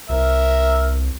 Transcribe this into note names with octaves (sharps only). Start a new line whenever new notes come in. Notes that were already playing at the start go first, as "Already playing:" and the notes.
C2 A#4 E5